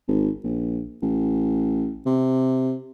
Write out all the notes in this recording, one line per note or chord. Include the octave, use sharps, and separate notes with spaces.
G#1
A#1
A1
C3